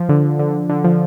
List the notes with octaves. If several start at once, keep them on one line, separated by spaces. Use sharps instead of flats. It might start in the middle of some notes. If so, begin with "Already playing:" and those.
Already playing: F3
D3
D3
D3
F3